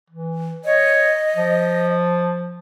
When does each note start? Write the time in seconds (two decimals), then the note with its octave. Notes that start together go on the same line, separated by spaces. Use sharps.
0.10 E3
0.65 C#5 D#5
1.36 F3